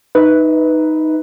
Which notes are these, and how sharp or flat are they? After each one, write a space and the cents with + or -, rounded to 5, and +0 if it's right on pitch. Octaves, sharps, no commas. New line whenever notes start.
D#4 +0 B4 +0 E5 -35